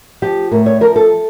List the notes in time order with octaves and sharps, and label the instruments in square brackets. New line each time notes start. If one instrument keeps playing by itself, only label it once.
[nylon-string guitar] F3 G4
A2 A#4
C#5
F3 A#4
A4